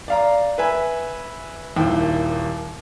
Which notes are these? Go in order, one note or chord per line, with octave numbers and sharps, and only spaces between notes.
D5 F5 A#5
B4 E5 G#5
D#1 D#2 E4 G5